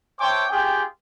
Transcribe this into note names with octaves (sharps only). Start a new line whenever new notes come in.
C5 C#5 E5 G5 A5 D6
C#4 F4 G4 G#4 G5